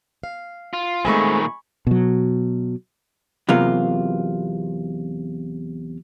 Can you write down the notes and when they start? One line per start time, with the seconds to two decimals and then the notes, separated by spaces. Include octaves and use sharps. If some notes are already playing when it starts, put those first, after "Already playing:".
0.23 F5
0.73 F4
1.05 A#2 D#3 G#3 A3 C4 G#5 B5 C#6
1.87 B2 F#3
3.49 E2 C3 F#3 A#3 F4